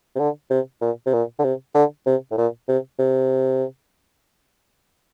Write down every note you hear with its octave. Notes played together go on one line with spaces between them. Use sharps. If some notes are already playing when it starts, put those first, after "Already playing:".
C3
D3
C3
A#2
C3
A#2
D3
C3
D3
C3
A2
A#2
C3
C3